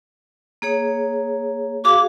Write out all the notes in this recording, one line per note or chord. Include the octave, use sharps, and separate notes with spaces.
A#3 G#4 C#5
F#4 G#4 F5 D6